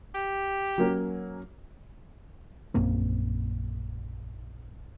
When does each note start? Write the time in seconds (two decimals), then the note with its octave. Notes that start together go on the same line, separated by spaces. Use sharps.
0.15 G4
0.78 F#3 A#3 C#4
2.74 A#1 F#2 A#3 C4